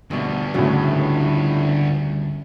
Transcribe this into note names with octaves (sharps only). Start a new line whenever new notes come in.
D2 G2 B2 D3
D2 A2 C#3 F#3